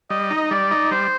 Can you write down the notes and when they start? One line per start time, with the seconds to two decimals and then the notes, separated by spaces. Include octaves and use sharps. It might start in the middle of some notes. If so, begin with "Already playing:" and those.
0.10 G3 D#5
0.31 D#4
0.51 G3 D5
0.71 D#4
0.91 G3 C5